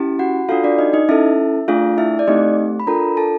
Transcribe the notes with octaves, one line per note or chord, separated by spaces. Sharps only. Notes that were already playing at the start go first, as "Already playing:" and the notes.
Already playing: C#4 E4 G4
F#4 F#5
D4 F4 F#4 A4 F5
D4 D5
D#4 D#5
D#4 D#5
C#4 E4 A4 E5
A3 D4 F4 G#4 F5
E4 E5
D5
A3 C4 D#4 G4 D#5
B5
D4 F4 A4 A#4 A#5
A4 A5